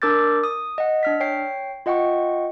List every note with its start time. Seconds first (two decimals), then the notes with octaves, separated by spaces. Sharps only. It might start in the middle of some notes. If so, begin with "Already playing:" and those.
0.02 D4 A#4 D6 E6 G6 A6
0.44 D#6
0.78 D#5 F#5
1.03 D4 F6 B6
1.20 C#5 G5 C7
1.86 F4 D#5 F#5 G5 C#6